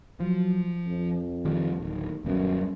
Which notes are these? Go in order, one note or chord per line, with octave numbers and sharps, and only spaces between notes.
F3 F#3
F2
D#3 F3 G3
D1 D#2
D#1 F#2 G3 B3